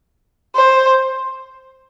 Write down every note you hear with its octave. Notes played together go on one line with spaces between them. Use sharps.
C5